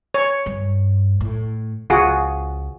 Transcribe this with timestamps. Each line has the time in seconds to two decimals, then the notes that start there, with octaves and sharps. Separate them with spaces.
0.14 C#5
0.46 G2
1.21 A2
1.90 C#2 F4 F#4 G#4